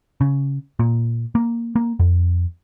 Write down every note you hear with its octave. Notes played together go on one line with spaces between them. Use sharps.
C#3
A#2
A#3
A#3
F2